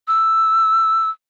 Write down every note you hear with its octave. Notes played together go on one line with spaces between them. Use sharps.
E6